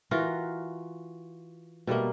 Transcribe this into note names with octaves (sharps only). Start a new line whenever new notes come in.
E3 F4 F#4 A#4
B2 G3 A3 A#3